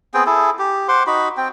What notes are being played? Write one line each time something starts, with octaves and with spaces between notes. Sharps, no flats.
B3 C4 G#4 G5
E4 G#4 A4
G4
C5 F#5 C6 D6
D#4 F#4 B5
C4 G5